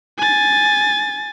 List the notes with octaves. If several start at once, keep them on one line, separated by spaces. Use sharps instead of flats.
G#5 A6